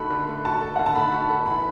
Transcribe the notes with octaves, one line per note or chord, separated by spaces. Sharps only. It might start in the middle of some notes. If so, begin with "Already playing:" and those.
Already playing: D3 A3 F#4 A4 B5
D3
A3
F#4 A5
A4
D3 F#5
A5
A3 B5
F#4
A4
E3 B5